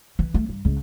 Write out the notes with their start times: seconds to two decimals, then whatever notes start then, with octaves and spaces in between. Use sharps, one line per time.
0.19 E3
0.34 A3
0.49 G2
0.65 C#2